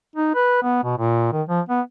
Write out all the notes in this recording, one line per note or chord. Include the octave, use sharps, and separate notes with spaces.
D#4
B4
B3
B2
A#2
D#3
F3
B3